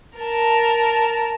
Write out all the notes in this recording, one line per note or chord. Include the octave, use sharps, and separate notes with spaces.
A#4 A5